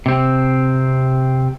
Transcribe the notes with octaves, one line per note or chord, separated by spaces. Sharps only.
C3 C4